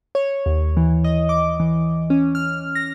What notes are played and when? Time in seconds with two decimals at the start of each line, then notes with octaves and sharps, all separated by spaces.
0.15 C#5
0.46 D#2
0.77 E3
1.04 D#5
1.29 D6
1.60 E3
2.10 C#4
2.35 F6
2.75 A#6